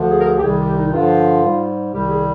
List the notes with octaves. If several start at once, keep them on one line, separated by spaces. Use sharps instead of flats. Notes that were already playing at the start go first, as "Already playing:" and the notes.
Already playing: D2 D3 F3
G#4
A#4
G#4
G4
C2 C3 D#3 G3 G#4
G4
D#4
G2 D3 F3 F4
G#2 G3
C2 C3 D#3 G3 G4
G#4